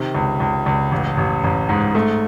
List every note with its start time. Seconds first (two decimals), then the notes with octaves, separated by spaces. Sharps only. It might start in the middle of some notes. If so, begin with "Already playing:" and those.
Already playing: C3 D#3
0.15 C#2
0.40 C#2
0.66 C#2
0.91 A1
1.17 A1
1.44 A1
1.69 G#2
1.95 A3